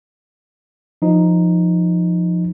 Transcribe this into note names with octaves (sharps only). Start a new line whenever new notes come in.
F3 D#4